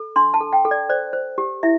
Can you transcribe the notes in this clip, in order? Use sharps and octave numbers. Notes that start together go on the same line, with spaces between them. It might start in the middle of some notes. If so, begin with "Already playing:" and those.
Already playing: A4
D4 C6
A5
A4
G5
A4
D5
C5 D5
C5
G4
E4 E5